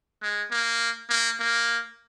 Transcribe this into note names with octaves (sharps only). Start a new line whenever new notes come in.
G#3
A#3
A#3
A#3